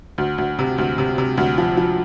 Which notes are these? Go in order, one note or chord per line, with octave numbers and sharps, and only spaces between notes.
D2
D2
C3
D2
C3
C3
D2
F3
F3